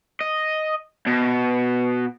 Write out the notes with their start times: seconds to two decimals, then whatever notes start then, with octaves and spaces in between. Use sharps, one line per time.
0.21 D#5
1.06 B2